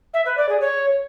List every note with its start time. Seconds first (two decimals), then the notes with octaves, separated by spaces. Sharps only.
0.13 E5
0.25 B4
0.37 D5
0.48 G#4
0.60 C#5